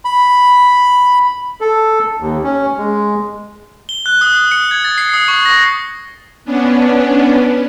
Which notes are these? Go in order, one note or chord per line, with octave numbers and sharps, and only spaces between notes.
B5
A4
D#2
C#4
G#3
G7
F#6
D#6
D#6
C#7
G#6
A6
C7
D#6
C#6
A#6
B3 C#4 D4